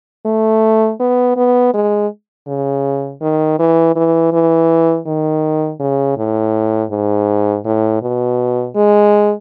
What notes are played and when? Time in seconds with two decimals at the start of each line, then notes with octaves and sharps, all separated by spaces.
0.26 A3
1.00 B3
1.36 B3
1.74 G#3
2.47 C#3
3.21 D#3
3.59 E3
3.96 E3
4.32 E3
5.06 D#3
5.80 C#3
6.17 A2
6.91 G#2
7.65 A2
8.02 B2
8.75 G#3